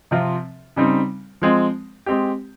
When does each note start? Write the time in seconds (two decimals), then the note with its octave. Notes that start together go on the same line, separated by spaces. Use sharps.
0.11 C3 F3 C4 F4
0.76 C#3 G3 C4 D#4
1.42 F3 G#3 C4
2.06 G#3 C4 G4